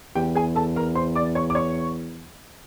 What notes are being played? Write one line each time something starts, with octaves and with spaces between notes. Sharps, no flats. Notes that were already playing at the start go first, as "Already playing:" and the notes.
E2 G4 G5
G#4 G#5
A4 A5
A#4 A#5
C5 C6
D5 D6
C#5 C#6
D6
C#5 C#6